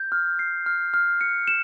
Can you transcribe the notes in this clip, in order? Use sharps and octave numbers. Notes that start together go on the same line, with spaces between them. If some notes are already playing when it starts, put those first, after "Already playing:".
Already playing: G6
F6
C7
F6
F6
C#7
E7